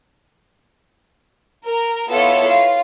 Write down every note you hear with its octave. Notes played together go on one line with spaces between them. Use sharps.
A#4
B3 E4 F4 A4 C#5 C#7
F4 C7